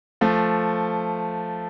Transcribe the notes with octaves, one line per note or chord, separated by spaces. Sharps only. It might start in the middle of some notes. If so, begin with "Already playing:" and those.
F3 A3